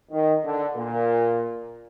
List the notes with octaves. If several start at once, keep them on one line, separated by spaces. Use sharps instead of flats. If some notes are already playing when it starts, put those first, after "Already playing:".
D#3
D3
A#2